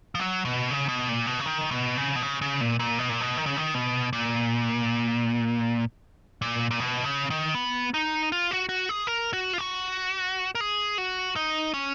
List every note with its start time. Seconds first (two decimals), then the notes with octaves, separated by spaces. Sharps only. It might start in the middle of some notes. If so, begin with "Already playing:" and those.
0.15 F3
0.19 F#3
0.45 B2
0.71 C#3
0.88 B2
1.09 A#2
1.26 B2
1.40 C#3
1.46 D#3
1.71 B2
1.97 C#3
2.16 B2
2.22 C#3
2.41 C#3
2.61 A#2
2.80 A#2
2.98 B2
3.09 A#2
3.21 B2
3.37 D#3
3.46 C#3
3.57 D#3
3.74 B2
4.13 A#2
6.42 A#2
6.71 A#2
6.80 B2
7.04 C#3
7.30 D#3
7.55 B3
7.94 D#4
8.32 F4
8.51 F#4
8.69 F#4
8.89 G#4
9.07 A#4
9.33 F#4
9.53 F4
9.58 F#4
10.55 A#4
10.61 G#4
10.98 F#4
11.36 D#4
11.74 C#4